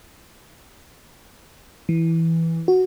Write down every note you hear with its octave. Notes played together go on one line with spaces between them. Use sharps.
E3
F#4